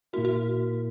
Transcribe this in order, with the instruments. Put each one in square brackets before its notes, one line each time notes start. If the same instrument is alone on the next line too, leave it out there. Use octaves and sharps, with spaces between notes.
[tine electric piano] A#2 A#3 E4 A#4 [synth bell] F#4
[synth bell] F#4